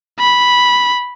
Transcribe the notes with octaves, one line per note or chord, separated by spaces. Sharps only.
B5